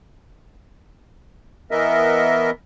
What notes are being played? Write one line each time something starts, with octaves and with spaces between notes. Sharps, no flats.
E3 B3 A#4 D#5 E5